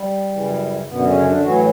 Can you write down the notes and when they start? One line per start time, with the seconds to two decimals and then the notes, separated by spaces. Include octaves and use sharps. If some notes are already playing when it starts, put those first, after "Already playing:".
Already playing: G3
0.32 F#2 C#3 E3
0.88 F#2 B2 D3 B3
1.07 C#3 C#4
1.25 D3 D4
1.43 A2 E3 F#3 F#4